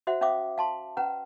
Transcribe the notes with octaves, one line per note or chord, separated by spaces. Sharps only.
F#4 C5 E5 F#5
C#4 C5 E5 F5 D6 D#6
F5 A5 C6
C#4 B4 F#5 A#5